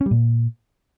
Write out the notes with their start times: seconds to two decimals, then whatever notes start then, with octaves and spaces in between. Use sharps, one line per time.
0.01 C#4
0.06 G3
0.11 A#2